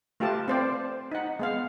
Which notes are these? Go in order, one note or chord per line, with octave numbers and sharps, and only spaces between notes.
A3 F4 G4 B4 A5
C4 C5 D5
D#4 F#5
G#3 B3 F5